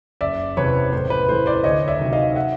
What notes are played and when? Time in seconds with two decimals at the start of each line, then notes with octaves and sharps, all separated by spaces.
0.21 F#1 D5 E5
0.57 E2 C3 B4 C#5
0.92 A2 C5
1.10 B4
1.29 E3 A3 C5
1.46 C5 D5
1.64 D2 C#5 D#5
1.88 D5 E5
2.00 C3 D#3 F#3
2.13 D#5 F5
2.36 E5 F#5